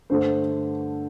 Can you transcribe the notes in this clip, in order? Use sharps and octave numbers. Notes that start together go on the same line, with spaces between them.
G2 D3 A3 C5